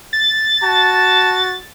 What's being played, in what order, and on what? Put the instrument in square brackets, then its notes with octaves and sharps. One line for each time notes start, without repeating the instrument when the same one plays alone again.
[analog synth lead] A6
[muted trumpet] F#4 [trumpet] A5